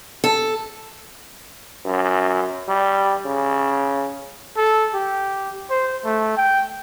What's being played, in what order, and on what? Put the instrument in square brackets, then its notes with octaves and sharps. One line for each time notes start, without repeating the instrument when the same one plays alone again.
[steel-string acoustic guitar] A4
[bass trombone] F#2
G3
C#3
[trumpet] A4
G4
C5
A3
G5